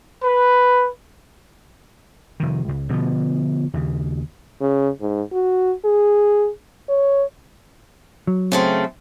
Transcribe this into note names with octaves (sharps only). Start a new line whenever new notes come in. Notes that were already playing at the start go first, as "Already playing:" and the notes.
B4
F1 D#3
C#2
B2 D3 E3 F3
D#2 C#3
C#3
G#2
F#4
G#4
C#5
F#3
C#3 A3 C4